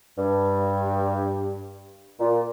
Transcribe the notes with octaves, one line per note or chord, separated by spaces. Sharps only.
G2
A#2